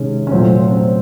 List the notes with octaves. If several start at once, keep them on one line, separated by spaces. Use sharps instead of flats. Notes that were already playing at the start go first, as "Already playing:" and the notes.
Already playing: C3 D#3 G#3 C#4
C#4
A#2 F#3 A3 C4
C4